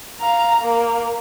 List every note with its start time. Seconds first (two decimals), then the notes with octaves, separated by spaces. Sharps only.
0.21 F5 A#5
0.62 A#3